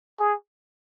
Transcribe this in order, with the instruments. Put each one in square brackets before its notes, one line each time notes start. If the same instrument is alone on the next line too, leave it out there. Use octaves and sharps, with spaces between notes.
[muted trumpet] G#4